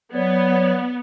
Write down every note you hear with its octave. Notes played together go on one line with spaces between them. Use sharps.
F#3 B3 C#5 D5